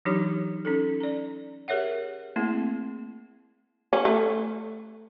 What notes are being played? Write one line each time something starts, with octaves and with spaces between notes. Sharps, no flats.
E3 F#3 D4 D#4 G4 C#5
C#4 D#4 A4
D5 A#5
G4 G#4 A#4 C#5 E5 F#5
A3 A#3 C4 E4 G#4
C#4
A3